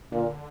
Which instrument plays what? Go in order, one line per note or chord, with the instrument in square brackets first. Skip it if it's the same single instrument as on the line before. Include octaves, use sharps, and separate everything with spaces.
[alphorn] A#2 [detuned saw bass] D3